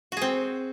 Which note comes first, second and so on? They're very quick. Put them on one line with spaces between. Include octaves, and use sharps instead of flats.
F#4 G#4 C4